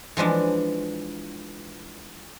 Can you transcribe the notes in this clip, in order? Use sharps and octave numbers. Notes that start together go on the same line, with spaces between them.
E3 F3 G#3 D4